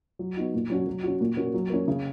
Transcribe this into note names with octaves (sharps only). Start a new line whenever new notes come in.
F#3
B3 D#4 F#4
A#2
F#3 C#4 F#4
F#3
C#4 F#4
A#2
A#3 C#4 F#4
F#3
A#3 C#4
C#3